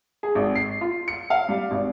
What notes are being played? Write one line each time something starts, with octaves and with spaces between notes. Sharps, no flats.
G#4
G#1
C7
F4
C#7
F5
G3
G#1